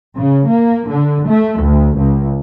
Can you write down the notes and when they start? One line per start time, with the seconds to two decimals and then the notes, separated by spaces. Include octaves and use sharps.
0.16 C#3
0.47 A#3
0.88 D3
1.27 A3
1.60 D2
1.96 C#2